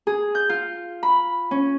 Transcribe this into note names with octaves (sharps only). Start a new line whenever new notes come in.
G#4
G6
F4
B5
C#4